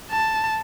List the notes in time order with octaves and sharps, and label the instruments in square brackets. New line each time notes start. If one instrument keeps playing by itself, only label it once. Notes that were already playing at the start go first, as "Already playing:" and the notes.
[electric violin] A5